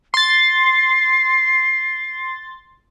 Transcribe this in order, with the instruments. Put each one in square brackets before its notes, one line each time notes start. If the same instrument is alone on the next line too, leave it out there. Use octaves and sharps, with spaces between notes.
[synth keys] C6 A6 [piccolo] C7